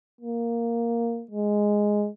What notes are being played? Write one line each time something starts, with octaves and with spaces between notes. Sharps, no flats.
A#3
G#3